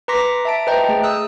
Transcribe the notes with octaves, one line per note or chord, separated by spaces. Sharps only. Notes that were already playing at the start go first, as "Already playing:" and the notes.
B4 A#5 C6 D6 A#6 B6
E5 A5 D7
B4 C5 D#5 G5 A#5 G6
A3 G#4
D#6 E6 F#6